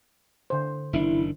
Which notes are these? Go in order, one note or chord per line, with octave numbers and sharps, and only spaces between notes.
D3 C5
F#1 D#3 D4 E4